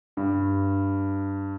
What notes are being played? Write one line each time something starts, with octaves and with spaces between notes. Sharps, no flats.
G2